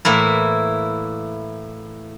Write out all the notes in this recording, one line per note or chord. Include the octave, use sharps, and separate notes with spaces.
A2 E3 A#3 E4